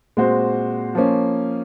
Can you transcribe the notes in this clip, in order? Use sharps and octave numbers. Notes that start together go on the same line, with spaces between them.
A#2 G#3 C4 F#4 C5
F3 A#3 C#4